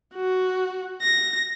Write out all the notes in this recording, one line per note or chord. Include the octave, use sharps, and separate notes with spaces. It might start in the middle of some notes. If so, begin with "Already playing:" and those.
F#4
A#6